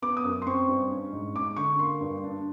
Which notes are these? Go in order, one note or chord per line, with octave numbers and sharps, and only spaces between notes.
B3 D6
D#6
F#2
C6
C4 C#6
G2
C#4
G#2
C#4 D6
D3 C#6
A#3 C6
G2
D4